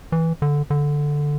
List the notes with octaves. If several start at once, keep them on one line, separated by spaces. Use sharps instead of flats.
E3
D3
D3